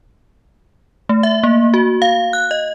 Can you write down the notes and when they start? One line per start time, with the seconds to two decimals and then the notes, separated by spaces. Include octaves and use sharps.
1.09 A3
1.23 E5
1.43 A#3
1.74 F#4
2.02 F5
2.33 F#6
2.51 D#5